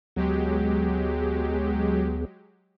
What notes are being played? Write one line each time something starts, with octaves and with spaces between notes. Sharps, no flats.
D2 F#3 G#3 B3 G4 G#4